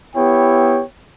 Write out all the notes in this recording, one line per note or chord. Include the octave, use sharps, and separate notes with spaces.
B3 E4 G4 C#5 G5